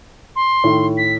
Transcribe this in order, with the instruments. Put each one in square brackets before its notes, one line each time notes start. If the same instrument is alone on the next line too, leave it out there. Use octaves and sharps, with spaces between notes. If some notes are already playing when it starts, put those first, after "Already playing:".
[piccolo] C6
[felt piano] A2 D#3
[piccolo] B6